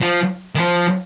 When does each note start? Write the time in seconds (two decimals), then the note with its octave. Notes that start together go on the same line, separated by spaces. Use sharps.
0.02 F3
0.55 D#3
0.59 F3